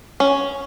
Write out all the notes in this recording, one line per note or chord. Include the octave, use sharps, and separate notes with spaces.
C#4